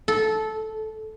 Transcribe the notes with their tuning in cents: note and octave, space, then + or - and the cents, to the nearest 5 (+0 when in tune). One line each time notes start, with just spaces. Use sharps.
A4 -15